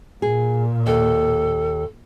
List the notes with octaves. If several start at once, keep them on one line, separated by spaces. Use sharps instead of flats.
A#2 G#4
D#2 A4